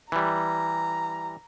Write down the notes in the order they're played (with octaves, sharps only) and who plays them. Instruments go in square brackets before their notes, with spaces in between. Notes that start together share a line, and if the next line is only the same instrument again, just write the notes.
[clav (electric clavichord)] E3 G3 [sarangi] A#5